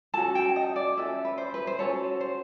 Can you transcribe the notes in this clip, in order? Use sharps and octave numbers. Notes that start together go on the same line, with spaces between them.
C#4 F#4 A4 A5
G5
D#5
D5
C#4 F#4 A4 E5
B4
C5
B4
C5
C#4 F#4 A4 C#5
C5